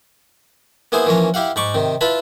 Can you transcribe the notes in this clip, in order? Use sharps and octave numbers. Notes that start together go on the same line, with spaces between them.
A#3 B3 E4 G#4 C5
E3 F3 A#3 C#4 A#5
E4 G4 F5 F#5
G#2 B5 C#6 D6
C3 D#3
E4 F4 B4 A5 B5